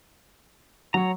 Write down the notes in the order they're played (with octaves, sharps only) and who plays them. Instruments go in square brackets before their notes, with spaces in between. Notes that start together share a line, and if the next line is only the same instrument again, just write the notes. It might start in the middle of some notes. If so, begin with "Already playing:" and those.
[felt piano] F#3 [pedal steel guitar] C#5 A#5